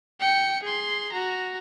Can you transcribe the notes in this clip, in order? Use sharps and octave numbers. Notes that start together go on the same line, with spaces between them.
G5 C#7
G#4 C6
F#4 A#5